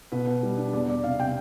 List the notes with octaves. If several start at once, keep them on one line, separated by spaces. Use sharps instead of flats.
B2 B4
B2
G3
D4
E2 D5
E2 D5
C3 F5
C3 G5